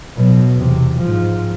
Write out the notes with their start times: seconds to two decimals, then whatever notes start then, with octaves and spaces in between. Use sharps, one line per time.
0.17 B2 F#3
0.54 E2 C3
0.98 G#2 F3